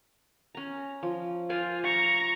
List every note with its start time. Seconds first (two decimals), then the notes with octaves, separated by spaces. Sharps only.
0.55 C#4 A#5
1.03 F3
1.50 F4 C5 D5 G#5
1.84 A#5 C#6